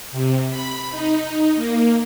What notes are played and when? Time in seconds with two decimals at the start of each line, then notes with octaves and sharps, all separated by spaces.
0.11 C3
0.49 B5
0.90 D#4
1.55 A#3